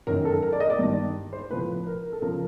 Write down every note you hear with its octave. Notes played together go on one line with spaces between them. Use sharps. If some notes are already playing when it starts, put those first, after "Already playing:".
F#2 D#3 A#4
A4
A#4
D5
D#5
D5
G2 D#3
C5
A2 F3 B4
A#4
A4
C#3 F3 A#4